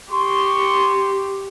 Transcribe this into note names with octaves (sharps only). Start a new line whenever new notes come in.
G4 C6 C#6